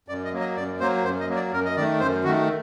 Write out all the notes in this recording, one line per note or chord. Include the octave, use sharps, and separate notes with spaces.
F#2 D5
D#5
F#3 A#3
D#5
F#2 D5
F#3 A#3 C5
F#2 C5
D#5
F#3 A#3
D5
F#2 A#4
D#5
D#3 A3 D5
F#2 C5
D#3 A3 F#4